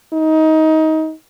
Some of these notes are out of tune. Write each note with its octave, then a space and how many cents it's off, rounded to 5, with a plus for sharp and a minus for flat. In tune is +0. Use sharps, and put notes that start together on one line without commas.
D#4 +20